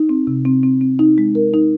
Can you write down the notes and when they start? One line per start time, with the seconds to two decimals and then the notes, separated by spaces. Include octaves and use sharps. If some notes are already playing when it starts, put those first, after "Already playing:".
Already playing: D#4
0.09 C4
0.27 C3
0.45 C4
0.63 C4
0.81 C4
0.99 D#4
1.18 G#3
1.35 A#4
1.54 D#4